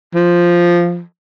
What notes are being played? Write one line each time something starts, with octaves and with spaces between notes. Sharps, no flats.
F3